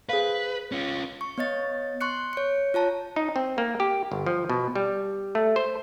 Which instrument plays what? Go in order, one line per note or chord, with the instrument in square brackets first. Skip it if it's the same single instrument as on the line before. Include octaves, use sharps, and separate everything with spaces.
[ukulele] G#4 C5 F5 [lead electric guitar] B4
[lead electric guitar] C#4 F4
[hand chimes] C#6
B3 C#5 D#5 A6
C6 C#6 F#6 C#7
C#5 C#7
F4 C#5 A5 A#5
[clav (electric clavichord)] D#4
C4
A#3
G4
G1
F3
B2
G3
A3
C5